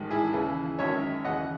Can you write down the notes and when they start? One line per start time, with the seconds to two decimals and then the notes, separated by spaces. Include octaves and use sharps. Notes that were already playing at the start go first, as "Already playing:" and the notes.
Already playing: A1 G#2 D#3
0.10 E4 G#4
0.33 D#2 C#3 E3
0.79 G#1 F#2 D#3 C#5 E5
1.24 D#2 C#3 E3 D#5 F#5